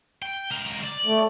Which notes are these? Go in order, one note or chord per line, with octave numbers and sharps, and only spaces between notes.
G5
C#2 A#4
D5
A3